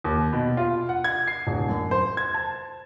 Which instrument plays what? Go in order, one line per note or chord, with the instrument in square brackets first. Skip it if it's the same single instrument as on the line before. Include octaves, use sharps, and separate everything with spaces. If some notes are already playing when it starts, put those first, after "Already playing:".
[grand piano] D#2
B2
F4
F#5
G#6
C7
D1
F#2
C5
G#6
A5